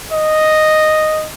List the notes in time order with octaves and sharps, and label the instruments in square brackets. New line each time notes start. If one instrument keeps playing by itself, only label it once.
[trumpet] D#5